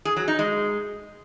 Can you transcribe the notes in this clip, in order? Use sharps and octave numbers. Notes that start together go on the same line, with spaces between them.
G#4
F#3
D#4
G#3